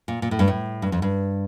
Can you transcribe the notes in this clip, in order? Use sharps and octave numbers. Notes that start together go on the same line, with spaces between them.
A#2
A#2
A2
G2
A2
G2
F2
G2